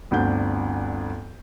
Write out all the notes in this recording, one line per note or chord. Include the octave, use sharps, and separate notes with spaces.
G1 D2 C4 D4 F#5 G6